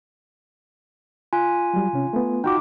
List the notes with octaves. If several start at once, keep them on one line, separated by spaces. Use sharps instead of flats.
F4 G#5
F#3 G3
C3 C#4
A3 B3
D#4 F4 F#4 G5 D6